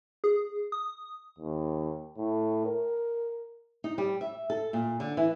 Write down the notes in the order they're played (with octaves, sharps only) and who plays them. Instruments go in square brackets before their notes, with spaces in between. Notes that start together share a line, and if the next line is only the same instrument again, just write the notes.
[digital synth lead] G#4
D#6
[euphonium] D#2
A2
A#4
[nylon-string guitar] D#4
G3
E5
A4
A#2
D3
E3